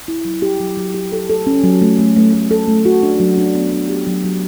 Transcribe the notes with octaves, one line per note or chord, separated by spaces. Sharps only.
E4
F#3
G4
F#3
F#3
G4
A4
A4
C#4
F#3
A3
A3
A3
A3
A4
A3
F#4
D4
F#3
D4
B3
D4
G4
F#3
F#3